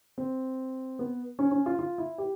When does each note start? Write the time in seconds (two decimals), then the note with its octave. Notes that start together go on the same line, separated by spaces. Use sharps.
0.18 C4
0.99 B3
1.39 C#4
1.51 C#4
1.66 F4
1.79 F4
1.98 E4
2.18 G4